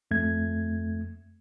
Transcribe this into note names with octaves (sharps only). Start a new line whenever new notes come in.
F2 A3 G#6